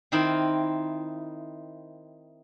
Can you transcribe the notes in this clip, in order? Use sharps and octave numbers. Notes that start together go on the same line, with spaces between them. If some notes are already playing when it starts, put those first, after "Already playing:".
D#3 C4 D#4 E4